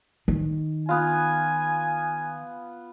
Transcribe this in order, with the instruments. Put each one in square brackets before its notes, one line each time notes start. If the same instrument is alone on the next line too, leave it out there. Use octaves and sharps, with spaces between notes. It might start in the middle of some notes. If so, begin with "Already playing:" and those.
[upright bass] D#3
[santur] B3 F4 [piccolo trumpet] G#5